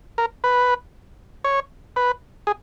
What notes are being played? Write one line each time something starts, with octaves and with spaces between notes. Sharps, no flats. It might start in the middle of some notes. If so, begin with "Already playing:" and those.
A#4
B4
C#5
B4
G#4